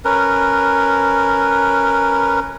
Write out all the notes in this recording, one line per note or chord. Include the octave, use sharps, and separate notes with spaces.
C#4 A#4 B4